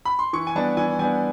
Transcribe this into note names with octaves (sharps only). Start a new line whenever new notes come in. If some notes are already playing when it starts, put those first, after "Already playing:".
B5
C6
E3 C#6
G#5
G3 B3 D4 A5
E3 G#5
G3 B3 D4 G#5